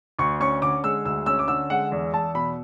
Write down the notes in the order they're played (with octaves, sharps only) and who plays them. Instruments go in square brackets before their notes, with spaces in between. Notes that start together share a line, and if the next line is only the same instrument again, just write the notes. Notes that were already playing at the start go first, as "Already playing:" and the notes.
[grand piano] D2 C#6
C#4 C#6
D3 D6
G#3 E6
D2 E6
C#4 E6
D6
D3 E6
G#3 F#5
E2
E2 A5
B2 B5